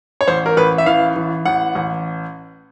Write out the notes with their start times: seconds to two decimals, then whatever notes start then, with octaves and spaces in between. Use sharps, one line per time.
0.21 C#5
0.28 A1 C5
0.46 A#4
0.57 A1 B4
0.78 E5
0.86 E3 F5
1.16 E3
1.45 A1 F#5
1.75 A1